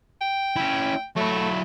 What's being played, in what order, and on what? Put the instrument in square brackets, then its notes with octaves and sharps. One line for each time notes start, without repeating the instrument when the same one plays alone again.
[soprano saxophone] G5
[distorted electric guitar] C#4 E4
[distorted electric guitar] F#3 E4 [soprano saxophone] A3